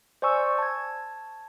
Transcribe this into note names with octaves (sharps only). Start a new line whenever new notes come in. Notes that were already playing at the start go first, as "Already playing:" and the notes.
C5 D5 G#5 C#6 E6
A5 G#6